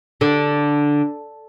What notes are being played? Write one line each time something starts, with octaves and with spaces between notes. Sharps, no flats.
D3